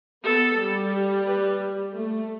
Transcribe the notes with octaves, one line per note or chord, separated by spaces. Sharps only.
B3 A4
G3
B4
A3